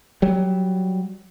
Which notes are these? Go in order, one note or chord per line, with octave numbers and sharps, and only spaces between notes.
F#3 G3